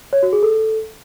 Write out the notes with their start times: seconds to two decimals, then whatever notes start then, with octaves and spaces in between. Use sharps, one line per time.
0.13 C#5
0.23 F#4
0.33 G#4
0.43 A4